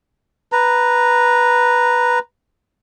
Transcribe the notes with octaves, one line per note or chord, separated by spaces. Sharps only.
B4 A#5